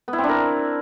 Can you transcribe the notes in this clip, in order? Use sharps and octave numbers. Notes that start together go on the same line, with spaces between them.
B3
E4
C4
D4
A#4